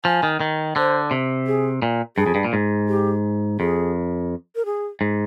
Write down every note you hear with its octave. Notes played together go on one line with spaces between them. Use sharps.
F3 G#5
D#3
D#3
D3 C5
C3
G#4
A#2
G2 G#4
F2
G2
A#2
G#2
G4
F2 G#4
A#4
G#4
G#2